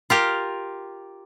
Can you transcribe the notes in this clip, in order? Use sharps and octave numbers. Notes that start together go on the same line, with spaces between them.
F4 G4 A#4